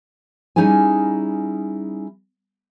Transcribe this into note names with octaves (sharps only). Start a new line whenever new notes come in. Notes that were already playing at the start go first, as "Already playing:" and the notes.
G3 C#4 D#4 E4 G#4 G#5